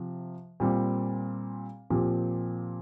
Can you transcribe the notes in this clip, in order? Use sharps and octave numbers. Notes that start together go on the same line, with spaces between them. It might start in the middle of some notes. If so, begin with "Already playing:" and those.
Already playing: C3 F3
A#2 G3 C4
A#2 F3 C4 G4